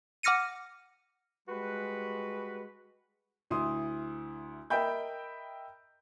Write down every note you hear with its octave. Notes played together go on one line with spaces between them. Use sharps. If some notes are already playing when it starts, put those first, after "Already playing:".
F#5 D6 F6 A#6 C#7 D#7
G3 G#3 F#4 B4
D2 E4 C6 D#6
A#4 D#5 E5 G5 B5 G6